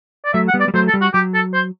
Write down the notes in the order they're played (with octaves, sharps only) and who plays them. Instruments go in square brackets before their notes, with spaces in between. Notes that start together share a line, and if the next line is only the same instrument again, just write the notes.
[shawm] D5
[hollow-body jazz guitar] F#3 A3 [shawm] E5
[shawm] F#5
[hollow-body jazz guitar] G3 B3
[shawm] D5
[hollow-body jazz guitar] G3
[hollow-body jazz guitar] F#3 A3 [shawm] C5
[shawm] A4
[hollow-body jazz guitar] G3
[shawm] F#4
[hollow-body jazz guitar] F#3 [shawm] G4
[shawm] A4
C5